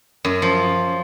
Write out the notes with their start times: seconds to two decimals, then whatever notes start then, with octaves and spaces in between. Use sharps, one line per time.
0.25 F#2
0.42 F3